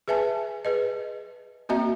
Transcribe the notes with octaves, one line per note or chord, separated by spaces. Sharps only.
G#4 B4 E5 G#5 A5
G#4 B4 D#5
A#3 C4 F#4 D#5 E5 A#5